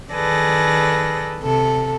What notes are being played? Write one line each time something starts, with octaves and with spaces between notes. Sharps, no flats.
D#3 G#4 A4 B4 D5 A#6
C3 A4